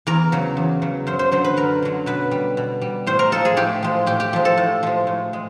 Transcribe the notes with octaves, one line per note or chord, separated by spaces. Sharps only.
E2 A#4
C#3 F#3
E2
C#3 F#3
F#2 C5
C5
D3 F#3 C5
B4
F#2 A#4
D3 F#3
B2 B4
G3
B2
G3
A2 C5
A#4
F3 G#3 A4
G#4
A2 G4
F3 G#3
A2 G4
G4
F3 G#3
A4
A2
F3 G#3
A2
G#3